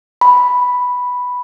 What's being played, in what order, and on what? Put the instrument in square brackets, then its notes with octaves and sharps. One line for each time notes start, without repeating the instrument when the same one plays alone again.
[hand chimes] B5